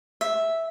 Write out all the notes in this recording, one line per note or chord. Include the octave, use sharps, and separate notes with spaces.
E5